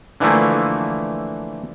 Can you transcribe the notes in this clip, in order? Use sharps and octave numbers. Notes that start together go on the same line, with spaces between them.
D3 E3 F3 A3 A#3